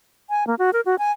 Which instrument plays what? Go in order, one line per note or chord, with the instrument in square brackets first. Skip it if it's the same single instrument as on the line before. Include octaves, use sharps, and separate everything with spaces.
[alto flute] G#5
A#3
F#4
A#4
F#4
G#5